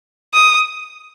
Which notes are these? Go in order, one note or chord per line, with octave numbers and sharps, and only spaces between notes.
D#6